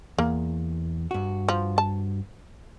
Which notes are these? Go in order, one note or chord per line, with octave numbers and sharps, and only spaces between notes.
E2 A#3
G2 F#4
F3
A5